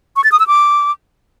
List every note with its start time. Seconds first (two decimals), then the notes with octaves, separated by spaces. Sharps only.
0.16 C#6
0.24 A6
0.32 D#6
0.39 E6
0.47 D6